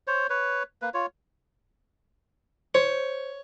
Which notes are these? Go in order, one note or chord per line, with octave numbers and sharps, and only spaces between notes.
C5 C#5
B4 C#5
A#3 B4
F4 C#5
C5 C#5